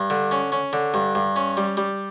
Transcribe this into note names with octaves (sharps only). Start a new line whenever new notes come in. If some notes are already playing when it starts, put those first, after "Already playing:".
Already playing: G2
D3
C#4
C#4
D3
G2
G2
C#4
G3
G3